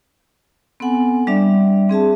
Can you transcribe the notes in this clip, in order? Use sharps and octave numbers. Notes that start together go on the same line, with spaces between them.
B3 C4 A4 F#5 G#5
G3 D4 D5 E5
C4 G#4 E5 A5